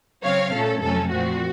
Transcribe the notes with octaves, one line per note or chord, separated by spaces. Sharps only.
C#3 F#3 C4 C#5 F5
A#2 A3 C#4 A4
F2 C3 F#3 A3 C#4 A4
A#2 F3 C4 F#4